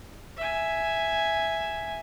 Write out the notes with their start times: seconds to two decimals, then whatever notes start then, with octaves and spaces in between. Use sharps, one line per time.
0.37 E5 G#5